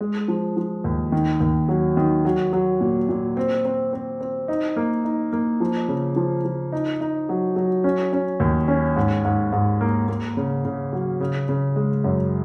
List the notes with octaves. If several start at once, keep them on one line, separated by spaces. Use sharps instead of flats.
G#3
F3
F3
D#2
D#3
D#2
F#3
D#3
F#3
F#3
A#2
A#2
C4
C4
C4
C4
D#4
A#3
D#4
A#3
F3
C#3
F3
F3
D#4
D#4
F#3
F#3
C#4
C#4
D#2
C#4
G#2
G#2
G#2
A#3
A#3
C#3
C#3
F#3
C#3
C#3
G#3
F#2